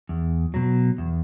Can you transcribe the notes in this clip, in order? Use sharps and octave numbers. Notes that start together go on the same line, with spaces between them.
E2
B2 F#3
E2